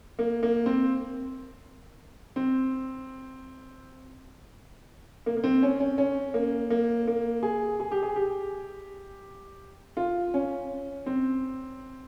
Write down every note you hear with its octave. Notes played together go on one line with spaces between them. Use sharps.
A#3
A#3
C4
C4
A#3
A#3
C4
C#4
C#4
C#4
A#3
A#3
A#3
G#4
G#4
G4
G#4
G4
F4
C#4
C4